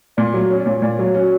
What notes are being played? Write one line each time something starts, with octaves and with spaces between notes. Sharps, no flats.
A#2 D5
F#3
C#4
D5
A#2 C#5
A#2 D5
F#3 C#5
C#4 F#4